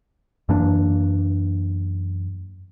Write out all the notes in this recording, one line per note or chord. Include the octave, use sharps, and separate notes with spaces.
F#2 E3 A#3 D4